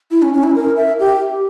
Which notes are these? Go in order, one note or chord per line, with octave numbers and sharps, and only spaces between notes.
E4
C#4
C#4
E4
A#4
E5
G4